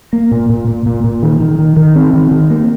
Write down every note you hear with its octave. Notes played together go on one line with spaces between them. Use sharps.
A#3
A#2
A#2
A#2
A#2
A#2
D#3
D#3
D#3
D#3
C4
D#3
D#3
A#3